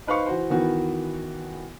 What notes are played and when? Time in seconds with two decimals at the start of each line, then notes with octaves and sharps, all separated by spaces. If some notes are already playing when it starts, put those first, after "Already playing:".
0.07 D#4 B4 C5 F5 C#6
0.26 E3 F#4 C5
0.50 D#3 E3 B3 F#4